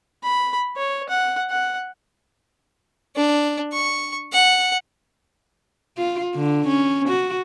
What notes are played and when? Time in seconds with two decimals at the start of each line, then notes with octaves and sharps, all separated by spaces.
0.23 B5
0.76 C#5
1.09 F#5
1.50 F#5
3.16 D4
3.72 C#6
4.32 F#5
5.97 F4
6.35 D3
6.68 C#4
7.09 F#4